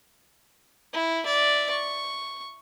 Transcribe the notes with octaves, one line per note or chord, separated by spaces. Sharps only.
E4
D5 E5
C#6